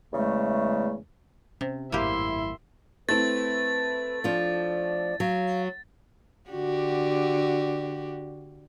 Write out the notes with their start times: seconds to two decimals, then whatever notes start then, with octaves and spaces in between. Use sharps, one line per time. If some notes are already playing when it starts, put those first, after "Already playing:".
0.13 E2 C#3 G#3 A3
1.61 C3 C#4
1.92 G#1 F#2 A2 A#3 E4 G4 E5 C6
3.09 A3 C4 E4 B4 A6
4.24 F3 D4 F4 D5
5.20 F#3 F5
6.50 D3 F#4 G4